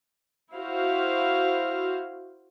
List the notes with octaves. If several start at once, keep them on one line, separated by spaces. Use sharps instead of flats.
E4 F#4 C5 F5